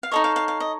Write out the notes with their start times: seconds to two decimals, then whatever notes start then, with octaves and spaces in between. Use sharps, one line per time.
0.03 F5
0.11 D#4 A4 C#5 D#5
0.24 F5
0.36 F5
0.48 F5
0.60 D#5